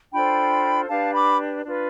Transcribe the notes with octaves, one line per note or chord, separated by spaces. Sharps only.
D4 F4 A4 C5 G5 B5
D4 G4 B4 F5 A5
B5 D6
D4 F4 B4